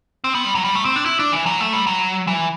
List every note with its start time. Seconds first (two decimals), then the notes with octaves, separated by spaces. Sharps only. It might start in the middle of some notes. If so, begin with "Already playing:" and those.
0.24 C4
0.35 B3
0.45 G3
0.55 F#3
0.65 G3
0.75 A3
0.85 C4
0.96 D4
1.06 E4
1.19 D4
1.32 E3
1.46 F#3
1.60 A3
1.73 G3
1.87 F#3
2.27 E3